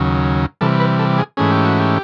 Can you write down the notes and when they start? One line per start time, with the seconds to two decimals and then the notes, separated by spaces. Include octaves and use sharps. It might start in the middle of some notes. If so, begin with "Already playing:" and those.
Already playing: D#2 C#3 F#3
0.61 C3 E3 G3 A4
0.80 B4
0.99 A4
1.18 G#4
1.37 G#2 E3 A3 C#4 G#4
1.52 G4
1.65 F#4
1.79 G4